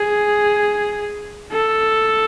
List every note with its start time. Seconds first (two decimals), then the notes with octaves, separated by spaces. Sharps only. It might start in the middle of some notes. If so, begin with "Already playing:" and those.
Already playing: G#4
1.52 A4